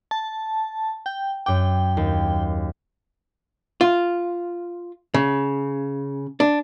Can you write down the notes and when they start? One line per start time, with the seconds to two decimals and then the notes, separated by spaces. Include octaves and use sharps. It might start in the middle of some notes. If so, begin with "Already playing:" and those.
0.11 A5
1.06 G5
1.46 F#2 G5 D6
1.97 D#2
3.81 F4
5.14 C#3
6.40 D4